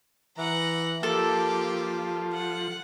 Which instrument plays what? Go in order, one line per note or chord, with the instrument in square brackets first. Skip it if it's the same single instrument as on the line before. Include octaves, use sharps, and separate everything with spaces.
[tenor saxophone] E3 [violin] F#5 A#5
[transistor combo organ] F3 [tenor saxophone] A#3 [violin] G4 [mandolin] A4
[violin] F#5